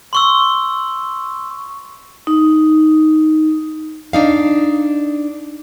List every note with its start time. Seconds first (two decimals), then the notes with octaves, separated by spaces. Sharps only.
0.13 C6 C#6 E6
2.27 D#4
4.13 D4 D#4 F5